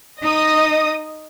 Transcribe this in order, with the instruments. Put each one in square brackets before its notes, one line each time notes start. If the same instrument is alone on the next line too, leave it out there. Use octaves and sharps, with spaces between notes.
[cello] D#4 [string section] D#5 D#6